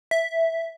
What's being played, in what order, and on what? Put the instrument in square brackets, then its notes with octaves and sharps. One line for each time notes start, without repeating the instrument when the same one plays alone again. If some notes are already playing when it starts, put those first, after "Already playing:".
[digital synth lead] E5